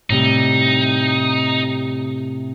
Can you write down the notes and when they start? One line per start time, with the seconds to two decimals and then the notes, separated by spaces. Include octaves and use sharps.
0.10 A2 C3 G3 D#4